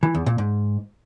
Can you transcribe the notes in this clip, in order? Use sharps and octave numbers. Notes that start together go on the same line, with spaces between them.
E3
E2
A#2
G#2